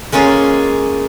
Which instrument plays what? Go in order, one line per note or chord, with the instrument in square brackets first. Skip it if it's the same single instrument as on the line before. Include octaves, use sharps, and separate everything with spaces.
[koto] G#3 A#3 C#4 F4 G#4